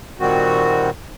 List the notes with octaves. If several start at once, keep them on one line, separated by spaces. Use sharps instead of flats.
A#2 D#3 G3 C4 F#4